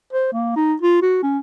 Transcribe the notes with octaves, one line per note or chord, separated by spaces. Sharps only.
C5
A#3
D#4
F4
F#4
C#4